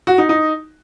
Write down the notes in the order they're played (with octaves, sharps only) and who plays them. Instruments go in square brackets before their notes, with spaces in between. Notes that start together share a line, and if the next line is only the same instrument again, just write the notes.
[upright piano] F#4
D#4
D#4